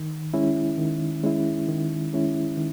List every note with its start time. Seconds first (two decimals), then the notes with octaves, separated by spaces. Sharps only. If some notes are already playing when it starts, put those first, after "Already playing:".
Already playing: D#3
0.33 G#3 C#4 E4
0.78 D#3
1.24 G#3 C#4 E4
1.69 D#3
2.13 G#3 C#4 E4
2.57 D#3